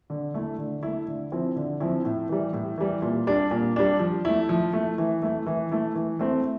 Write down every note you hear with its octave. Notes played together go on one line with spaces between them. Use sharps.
D3
A3 E4
D3
A3 E4
D3
F3 C4 E4
D3
F3 C4 E4
A2
E3 G3
A2
E3 G3
A#2
G3 D4
A#2
G3 D4
F3
A3 E4
F3
A3 E4
E3
A3 E4
E3
A3 E4
E3
A3 C4 E4